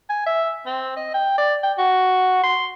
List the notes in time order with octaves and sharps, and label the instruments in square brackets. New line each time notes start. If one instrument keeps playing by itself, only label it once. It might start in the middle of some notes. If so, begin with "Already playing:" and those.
[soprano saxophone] G#5
E5
C4
D#5
G5
D5
G5
F#4
C6